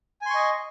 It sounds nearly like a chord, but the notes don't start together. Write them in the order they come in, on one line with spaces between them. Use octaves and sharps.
G#5 C6 C#6 D#5